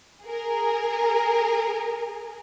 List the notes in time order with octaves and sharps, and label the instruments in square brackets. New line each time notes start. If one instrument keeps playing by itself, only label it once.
[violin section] G#4 A#4